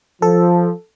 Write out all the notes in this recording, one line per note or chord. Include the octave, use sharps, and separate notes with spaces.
F3 A4